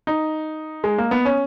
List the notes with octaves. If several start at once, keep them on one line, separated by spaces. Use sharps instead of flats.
D#4
G#3
A#3
B3
C#4